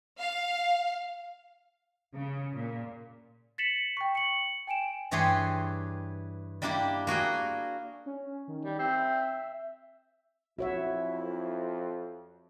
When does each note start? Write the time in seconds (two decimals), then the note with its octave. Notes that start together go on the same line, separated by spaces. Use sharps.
0.20 F5
2.14 C#3
2.54 A#2
3.58 A6 B6 C#7 E7 F#7
3.97 G5 C#6
4.15 C#7 F#7
4.67 G5 G#5 D7 E7
5.11 G2 E3 G4 G#4 C#5 C6
6.62 G3 A#3 D4 E4 G4
7.07 A#3 F#4 G#4 G5
8.06 C#4
8.48 D#3
8.65 G3
8.79 C4 E5
10.59 F2 E4 F#4 C#5 E5